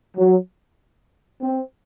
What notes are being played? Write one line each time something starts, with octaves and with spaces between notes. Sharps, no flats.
F#3
C4